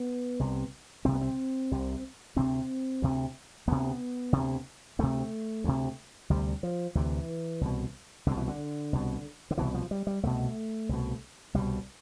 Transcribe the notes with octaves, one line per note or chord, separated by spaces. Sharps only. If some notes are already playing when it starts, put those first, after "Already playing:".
Already playing: B3
C2 C3
C2 C3 C4
B3
C4
C2 C3
D2 C3 C4
D2 C3
D2 C3 B3
D2 C3
D2 C3 A3
D2 C3
D2 C3 G3
F3
D2 C3 E3
C2 B2
C2 B2 D3
E3
D3
C2 B2
D3
C2 B2 E3
F3
G3
G3
C2 B2 A3
C2 B2
C2 B2 G3